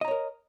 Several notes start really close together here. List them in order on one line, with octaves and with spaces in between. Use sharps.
D#5 A#5 C#5 A#4